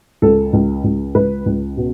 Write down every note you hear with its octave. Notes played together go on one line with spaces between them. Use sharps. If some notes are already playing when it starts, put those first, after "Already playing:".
C#2 A4
C#2
C#2
C#2 B4
C#2
B2